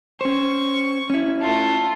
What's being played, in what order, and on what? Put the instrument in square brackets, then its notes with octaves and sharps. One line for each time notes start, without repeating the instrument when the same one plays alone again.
[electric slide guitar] C#4 C5 [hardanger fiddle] C#6
[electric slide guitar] C#4 E4
[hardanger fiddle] A3 F4